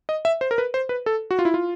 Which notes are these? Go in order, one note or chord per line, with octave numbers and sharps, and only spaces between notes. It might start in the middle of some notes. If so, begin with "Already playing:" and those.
D#5
E5
C5
A#4
B4
C5
B4
A4
F#4
F4
E4
F4